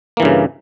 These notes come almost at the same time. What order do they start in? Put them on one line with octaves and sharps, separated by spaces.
A#3 E3 G2 C#3